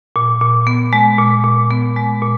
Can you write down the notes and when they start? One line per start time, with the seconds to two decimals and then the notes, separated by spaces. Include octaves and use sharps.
0.16 A#2
0.41 A#2
0.67 B3
0.93 G#3
1.19 A#2
1.44 A#2
1.71 B3
1.96 G#3
2.22 A#2